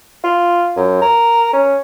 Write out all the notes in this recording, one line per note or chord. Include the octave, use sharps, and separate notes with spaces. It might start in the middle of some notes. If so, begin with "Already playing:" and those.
F4
F#2
A#4
C#4